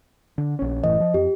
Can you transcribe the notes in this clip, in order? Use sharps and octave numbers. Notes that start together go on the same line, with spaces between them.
D3
A#1 C#4
F#1 A2 E3 D#5
F3
F2 G4